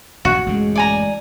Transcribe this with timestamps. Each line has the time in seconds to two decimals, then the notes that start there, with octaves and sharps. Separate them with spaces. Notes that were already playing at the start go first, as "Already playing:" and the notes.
0.25 A#1 G2 F#4
0.46 A1 F#2 C#3 G#3
0.76 D5 G#5 A#5